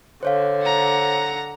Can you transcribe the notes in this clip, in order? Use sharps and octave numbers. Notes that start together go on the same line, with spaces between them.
D3 C5 C#5 F5
F#5 A#5